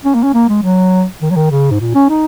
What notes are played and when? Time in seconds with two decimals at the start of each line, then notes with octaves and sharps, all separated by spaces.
0.05 C#4
0.14 A#3
0.23 C#4
0.34 A#3
0.49 G#3
0.63 F#3
1.22 D#3
1.30 F#3
1.36 D#3
1.51 C#3
1.71 G#2
1.80 A#2
1.95 C#4
2.09 D#4